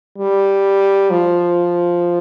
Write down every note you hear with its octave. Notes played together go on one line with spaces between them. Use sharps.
G3
F3